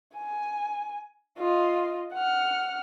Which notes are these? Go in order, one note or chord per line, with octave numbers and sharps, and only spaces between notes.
G#5
F4 D#5
F#5 F6